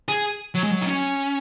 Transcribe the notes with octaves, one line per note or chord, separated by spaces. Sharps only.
G#4
F#3
G#3
F#3
D#4
C#4